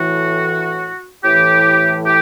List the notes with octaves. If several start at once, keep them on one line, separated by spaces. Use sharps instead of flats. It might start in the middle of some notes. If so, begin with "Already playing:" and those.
Already playing: A2 E3 F#4
A2 E3 G4
G4